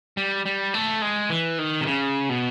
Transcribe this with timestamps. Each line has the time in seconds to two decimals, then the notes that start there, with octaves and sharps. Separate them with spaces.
0.17 G3
0.46 G3
0.74 A3
1.02 G#3
1.30 E3
1.59 D#3
1.81 C3
1.87 C#3
2.29 B2